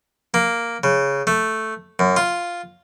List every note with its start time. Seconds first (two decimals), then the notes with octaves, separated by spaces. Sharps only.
0.34 A#3
0.84 C#3
1.27 A3
1.99 F#2
2.17 F4